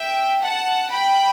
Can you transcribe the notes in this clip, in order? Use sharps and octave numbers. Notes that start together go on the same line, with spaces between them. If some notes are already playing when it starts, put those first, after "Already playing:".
Already playing: E5 G5
F#5 A5
G5 B5